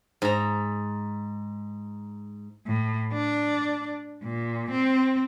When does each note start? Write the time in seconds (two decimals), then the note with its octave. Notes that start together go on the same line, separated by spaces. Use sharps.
0.22 G#2 A#5
2.67 A2
3.13 D4
4.24 A#2
4.71 C4